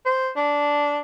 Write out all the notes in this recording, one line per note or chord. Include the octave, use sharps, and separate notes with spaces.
C5
D4